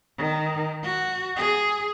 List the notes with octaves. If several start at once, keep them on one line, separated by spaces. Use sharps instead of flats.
D#3
F#4
G#4